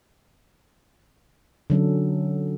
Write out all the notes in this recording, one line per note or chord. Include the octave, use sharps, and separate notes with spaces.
D3 F#3 C#4 A4